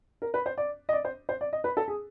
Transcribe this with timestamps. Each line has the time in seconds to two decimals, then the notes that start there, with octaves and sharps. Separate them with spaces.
0.22 A#4
0.34 B4
0.46 C5
0.58 D5
0.89 D#5
0.93 D5
1.05 C5
1.29 C5
1.41 D5
1.53 D#5
1.64 B4
1.77 A4
1.88 G#4